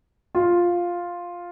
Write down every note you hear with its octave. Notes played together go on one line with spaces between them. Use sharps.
F4